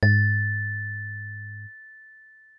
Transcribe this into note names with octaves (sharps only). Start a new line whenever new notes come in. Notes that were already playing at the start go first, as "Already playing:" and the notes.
G#2 A6